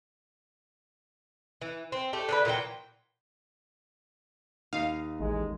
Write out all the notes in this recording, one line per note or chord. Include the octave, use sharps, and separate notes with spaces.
E3
C4
A3 G4
D3 A4 B4
A#2 E3 F#3 G5
D#2 D#4 F5
A1 G#3